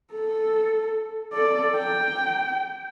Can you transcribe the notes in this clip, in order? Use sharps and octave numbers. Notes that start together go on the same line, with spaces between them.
A4
A4 D5
G5